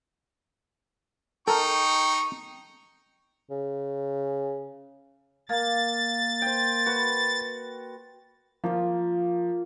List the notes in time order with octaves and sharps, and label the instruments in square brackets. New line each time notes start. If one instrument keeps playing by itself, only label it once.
[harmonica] D#4 G5 [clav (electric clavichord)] A4 A#4 [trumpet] C#6
[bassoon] C#3
[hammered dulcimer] A#3 [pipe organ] A6
[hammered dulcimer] C5 G5
F#4 B4
[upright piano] F3 [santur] A#3 F4